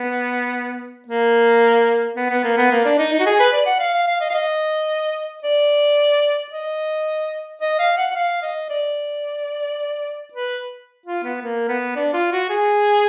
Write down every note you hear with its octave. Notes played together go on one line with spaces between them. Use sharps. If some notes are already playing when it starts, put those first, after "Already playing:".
Already playing: B3
A#3
B3
B3
A#3
B3
A#3
D4
D#4
D#4
F#4
G#4
B4
D5
F#5
F5
F5
F5
D#5
F5
D#5
D5
D#5
D#5
F5
F#5
F#5
F5
D#5
D5
B4
F4
B3
A#3
B3
D4
F4
F#4
G#4